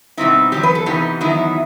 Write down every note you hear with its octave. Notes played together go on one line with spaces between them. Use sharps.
B2 G3 C4 D#4 E4
E2 B2 F#3 G4
B4
A4
C3 E3 B3 D#4 G4
E2 D#3 F#3 B3 D#4 E4